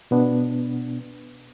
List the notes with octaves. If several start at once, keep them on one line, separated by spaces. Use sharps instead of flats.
B2 B3 D4